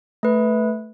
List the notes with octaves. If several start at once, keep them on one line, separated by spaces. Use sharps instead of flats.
A3 B4